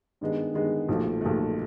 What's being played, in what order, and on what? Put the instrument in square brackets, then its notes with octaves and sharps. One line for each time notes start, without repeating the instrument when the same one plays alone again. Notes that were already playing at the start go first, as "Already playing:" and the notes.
[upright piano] G2 D#3 G#3 B3
G2 D#3 G#3 B3
B1 A#2 F3 A3
B1 A#2 F3 A3